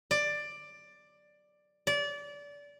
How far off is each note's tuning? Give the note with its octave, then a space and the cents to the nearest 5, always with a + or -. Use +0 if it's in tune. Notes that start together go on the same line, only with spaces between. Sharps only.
D5 +10
D5 -25